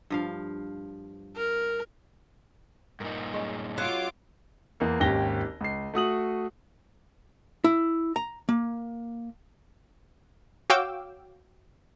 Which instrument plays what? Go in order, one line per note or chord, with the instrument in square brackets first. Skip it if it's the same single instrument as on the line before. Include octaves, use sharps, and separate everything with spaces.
[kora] G2 F3 F5
[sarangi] A#4
[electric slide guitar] G2 A#2 D#4 [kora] A#4
[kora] G#3 C#4
[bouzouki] F#3 [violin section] F4 D6
[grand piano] E2 A#3
G#1 D#2 C#4 G4 A#6 G7
C#2 C7
A3 F#4 D#6 F#7
[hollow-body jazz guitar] E4
A#5
A#3
[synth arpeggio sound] F#4 C#5 F5 G5 D6 E6